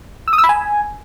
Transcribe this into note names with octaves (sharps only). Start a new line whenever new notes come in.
E6
D#6
E6
B5
G#5